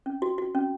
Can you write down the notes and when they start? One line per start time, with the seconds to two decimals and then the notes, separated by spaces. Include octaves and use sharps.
0.06 C#4
0.22 F#4
0.38 F#4
0.55 C#4